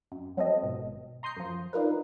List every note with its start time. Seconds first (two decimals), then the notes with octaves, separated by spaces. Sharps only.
0.12 F#2
0.37 F#3 C4 A4 D#5
0.63 G#1 G#2 B2
1.23 A#5 C6 D#6 G6 C7 C#7
1.36 F#2 F3
1.73 D4 D#4 F4 A#4 B4